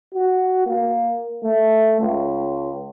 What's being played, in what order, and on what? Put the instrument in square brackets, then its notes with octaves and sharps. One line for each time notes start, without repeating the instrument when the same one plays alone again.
[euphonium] F#4
A#3
A3
C#2